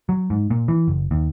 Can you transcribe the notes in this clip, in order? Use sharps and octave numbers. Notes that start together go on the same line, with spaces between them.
F#3
G#2
A#2
E3
F#1
D#2